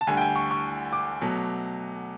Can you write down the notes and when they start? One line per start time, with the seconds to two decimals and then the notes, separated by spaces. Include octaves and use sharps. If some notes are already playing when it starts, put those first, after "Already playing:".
0.01 A5
0.07 D2 D3 G3 G#5
0.17 G5
0.21 G#5
0.36 C#6
0.51 C#6
0.93 D6
1.21 B2 F#3 A3